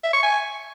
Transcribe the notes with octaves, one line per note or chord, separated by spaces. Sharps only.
E5
C#6
G#5